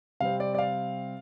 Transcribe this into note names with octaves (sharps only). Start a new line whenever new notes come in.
C3 G3 C4 F5
D5
D5
F5